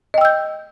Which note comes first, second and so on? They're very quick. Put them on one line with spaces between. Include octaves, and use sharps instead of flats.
D#5 G5 E6 G6